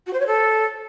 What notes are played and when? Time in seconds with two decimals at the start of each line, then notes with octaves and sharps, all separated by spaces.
0.06 F#4
0.13 C5
0.20 C#5
0.26 A4